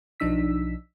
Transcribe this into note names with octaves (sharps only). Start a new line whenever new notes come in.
B1 F3 D4 D#4 E6 B6